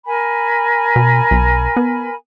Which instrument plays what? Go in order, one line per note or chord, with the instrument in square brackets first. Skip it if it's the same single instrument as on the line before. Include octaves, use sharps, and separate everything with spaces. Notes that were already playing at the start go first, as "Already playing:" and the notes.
[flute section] A#4 G#5 B5
[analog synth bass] B2
B1
B3